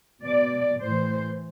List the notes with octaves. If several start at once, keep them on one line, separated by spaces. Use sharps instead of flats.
B2 D5
A2 E3 C5